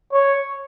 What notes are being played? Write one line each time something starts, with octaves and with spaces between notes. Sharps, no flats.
C#5